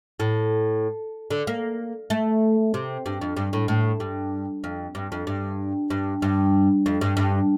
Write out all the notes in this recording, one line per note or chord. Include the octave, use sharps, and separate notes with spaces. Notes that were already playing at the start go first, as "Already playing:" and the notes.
A2
D3
A#3
A3
C3
G2
F2
G2
A2
A2
G2
F2
G2
F2
G2
G2
G2
F2
G2
G2